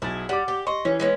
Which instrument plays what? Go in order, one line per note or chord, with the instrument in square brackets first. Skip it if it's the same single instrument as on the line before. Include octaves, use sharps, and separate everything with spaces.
[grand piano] B1 A6 [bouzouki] E4 G#4
[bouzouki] G3 [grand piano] F#5 D6
[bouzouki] G4
[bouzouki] D#5 [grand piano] C6 C#6
[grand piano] E3 [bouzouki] C#4
[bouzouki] G#3 B3 C#4